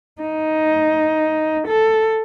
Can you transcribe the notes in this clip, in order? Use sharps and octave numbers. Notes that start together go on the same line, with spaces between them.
D#4
A4